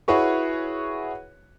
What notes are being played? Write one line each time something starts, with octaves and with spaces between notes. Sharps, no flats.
E4 F#4 G#4 B4 C#5 C#6